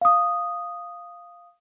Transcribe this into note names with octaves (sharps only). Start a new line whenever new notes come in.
F5 D#6